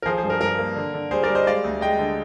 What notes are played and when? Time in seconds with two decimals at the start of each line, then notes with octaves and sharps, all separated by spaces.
0.02 A#4
0.06 F3 G#4 C5
0.17 G#4 C5
0.24 G2
0.30 A#4
0.41 G2 A#4
0.59 A#3
0.76 D3
0.94 D3
1.11 G3 G#4 C5
1.23 A#4 D5
1.29 G3
1.35 C5 D#5
1.47 G#3 D5 F5
1.64 D2
1.81 G#3 D#5 G5
1.99 D3